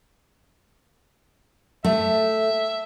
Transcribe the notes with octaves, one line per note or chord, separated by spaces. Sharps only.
A3 E5